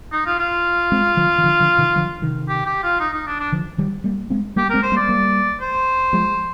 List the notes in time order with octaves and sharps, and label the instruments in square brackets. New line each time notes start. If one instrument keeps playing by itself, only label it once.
[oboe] D#4
F4
F4
[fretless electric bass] G#3 C4
D3 F3
D#3
D3 F3
D3 F3
C3 D#3
D3 F3
C3 D#3
[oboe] G4
G4
F4
D#4
D#4
D4
D4
[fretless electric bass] D3 F3
D#3 G3
G3 A#3
G#3 C4
[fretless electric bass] G3 A#3 [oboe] G4
[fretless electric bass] G#3 C4 [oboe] A#4
[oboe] C5
[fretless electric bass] G3 A#3
[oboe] D5
[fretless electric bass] G3 A#3
[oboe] C5
[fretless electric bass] F3 G#3